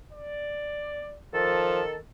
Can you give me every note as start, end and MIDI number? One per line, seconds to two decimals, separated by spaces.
0.13 1.16 74
1.34 1.96 51
1.34 1.83 53
1.34 1.96 69